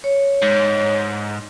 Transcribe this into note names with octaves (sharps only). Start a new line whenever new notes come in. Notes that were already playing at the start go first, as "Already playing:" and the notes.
C#5
G#2